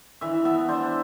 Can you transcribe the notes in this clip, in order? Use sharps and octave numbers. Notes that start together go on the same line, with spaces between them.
E3 E5
B3 E5
D4 C5